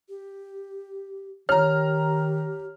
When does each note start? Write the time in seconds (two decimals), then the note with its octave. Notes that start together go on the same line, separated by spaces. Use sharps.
0.09 G4
1.49 D#3 G4 C#5 A#5 F6